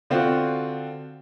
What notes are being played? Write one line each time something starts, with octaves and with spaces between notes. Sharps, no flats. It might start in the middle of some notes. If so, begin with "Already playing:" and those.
D3 C4 F4 F#4